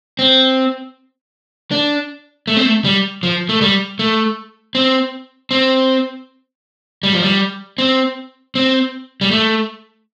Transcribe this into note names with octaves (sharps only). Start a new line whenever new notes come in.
C4
D4
A3
C4
A3
G3
F3
A3
G3
A3
C4
C4
G3
F3
G3
C4
C4
G3
A3